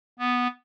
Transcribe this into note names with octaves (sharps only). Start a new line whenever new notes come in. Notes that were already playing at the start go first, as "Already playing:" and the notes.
B3